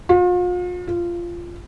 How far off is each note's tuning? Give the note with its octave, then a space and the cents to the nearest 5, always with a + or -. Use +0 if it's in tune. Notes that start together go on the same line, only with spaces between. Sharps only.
F4 +40
F4 -15